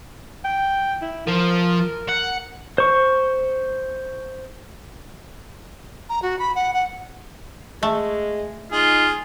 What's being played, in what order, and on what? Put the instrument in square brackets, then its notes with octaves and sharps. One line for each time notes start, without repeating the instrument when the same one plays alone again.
[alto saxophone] G5
E4
[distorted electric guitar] F3 [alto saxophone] A#4
[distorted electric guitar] F#5
[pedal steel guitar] C5 C#6
[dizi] A#5
F#4
B5
F#5
F#5
[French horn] G#3 [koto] A3
[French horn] D#4 [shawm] F4 [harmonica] G#4